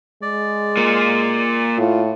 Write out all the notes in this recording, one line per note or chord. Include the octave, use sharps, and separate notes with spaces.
G#3 D5
A#3 F4
A2 F4